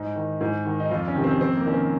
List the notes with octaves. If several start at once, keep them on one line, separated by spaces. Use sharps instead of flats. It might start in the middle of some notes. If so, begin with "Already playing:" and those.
Already playing: G#2 D#4
D#3
G#2
D#3
D#4
F2 F4
C#4
C3 D#3
C4
F2 C4
A#3
D#3 C#4
C4